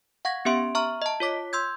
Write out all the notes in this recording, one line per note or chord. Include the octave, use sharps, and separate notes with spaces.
F5 F#5 C#6 G#6 A#6
B3 C#4 G4 E5 C6 D7
E5 A#5 C#6 F6
D#5 A5
F4 C#5 D6 B6
C6 E6 G6 G#6